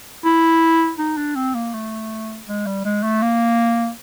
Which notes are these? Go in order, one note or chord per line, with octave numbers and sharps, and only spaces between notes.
E4
D#4
D4
C4
A#3
A3
G#3
G3
G#3
A3
A#3